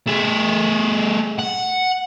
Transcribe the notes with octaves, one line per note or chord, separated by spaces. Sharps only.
A3 G#4
F#5